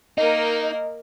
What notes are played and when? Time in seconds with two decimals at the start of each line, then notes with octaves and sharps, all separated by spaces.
0.18 A#3 D#4 A#4 D#5